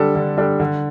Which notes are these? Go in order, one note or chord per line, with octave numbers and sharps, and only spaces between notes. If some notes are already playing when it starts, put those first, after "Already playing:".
Already playing: D3 G3 D4 A4
D3
G3 D4 A4
D3